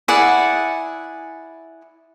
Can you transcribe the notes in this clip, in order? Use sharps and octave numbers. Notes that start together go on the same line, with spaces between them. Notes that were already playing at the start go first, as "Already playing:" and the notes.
E4 G#4 D5 F#5